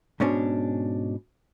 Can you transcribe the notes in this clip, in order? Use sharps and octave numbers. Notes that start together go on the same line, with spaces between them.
G#2 B2 C#4 D4